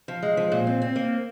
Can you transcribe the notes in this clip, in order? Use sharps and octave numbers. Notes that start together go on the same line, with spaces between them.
F3
G#3
F3
A#2
C4
C4
A#3